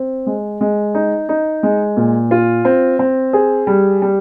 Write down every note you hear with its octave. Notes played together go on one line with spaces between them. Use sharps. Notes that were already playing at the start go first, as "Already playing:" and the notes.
Already playing: C4
G#3
G#3
D#4
D#4
G#3
A#2
F4
C4
C4
G#4
G3
G3